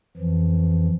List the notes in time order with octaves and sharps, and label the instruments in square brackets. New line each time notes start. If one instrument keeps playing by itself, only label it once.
[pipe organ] F2 E3 F3